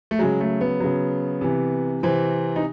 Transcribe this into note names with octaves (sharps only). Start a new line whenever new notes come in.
A3
C#3 F#3 G#3
A3
B3
C#3 F#3
C3 E3
C3 E3 C4
D#4